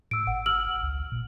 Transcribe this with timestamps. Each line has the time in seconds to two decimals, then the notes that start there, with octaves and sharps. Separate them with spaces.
0.11 A2 E6 D7
0.27 G#1 F#5
0.46 E6 F6 F#7
0.83 C#2
1.12 A#2